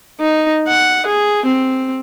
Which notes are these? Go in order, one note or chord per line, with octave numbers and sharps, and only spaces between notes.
D#4
F#5
G#4
C4